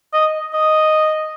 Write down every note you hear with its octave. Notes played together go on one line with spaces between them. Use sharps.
D#5
D#5